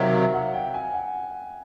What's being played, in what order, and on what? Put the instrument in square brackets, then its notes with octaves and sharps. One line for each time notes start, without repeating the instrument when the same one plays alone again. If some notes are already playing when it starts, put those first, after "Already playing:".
Already playing: [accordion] C3 D#3 F#3 [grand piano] E5 F5
[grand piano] F5
F#5
G5
G#5
F#5